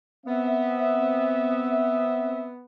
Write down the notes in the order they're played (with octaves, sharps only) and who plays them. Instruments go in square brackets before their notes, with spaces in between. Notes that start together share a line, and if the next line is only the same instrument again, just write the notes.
[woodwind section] B3 [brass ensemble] C4 E5